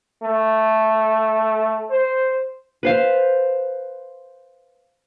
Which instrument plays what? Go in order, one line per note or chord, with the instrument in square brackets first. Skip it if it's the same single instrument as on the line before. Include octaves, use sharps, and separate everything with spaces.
[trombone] A3
C5
[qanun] B4 C5 F5